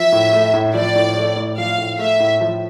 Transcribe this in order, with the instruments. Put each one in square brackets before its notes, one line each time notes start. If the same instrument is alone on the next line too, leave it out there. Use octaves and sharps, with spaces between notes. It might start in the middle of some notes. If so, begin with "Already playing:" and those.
Already playing: [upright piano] F3 [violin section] E5
[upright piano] A2
A3
A2
[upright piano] F3 [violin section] D5
[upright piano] A2
A3
A2
[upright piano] F3 [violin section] F5
[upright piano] A2
[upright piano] A3 [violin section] E5
[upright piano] A2
F3